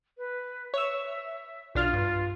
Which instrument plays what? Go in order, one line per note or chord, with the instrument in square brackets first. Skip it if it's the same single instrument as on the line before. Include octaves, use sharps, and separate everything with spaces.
[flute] B4
[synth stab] C#5 E6 [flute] E5
[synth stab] B1 D4 F6 [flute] F4
[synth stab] G2